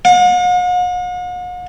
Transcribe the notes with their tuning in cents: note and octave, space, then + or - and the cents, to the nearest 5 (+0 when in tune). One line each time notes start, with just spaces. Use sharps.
F#5 -45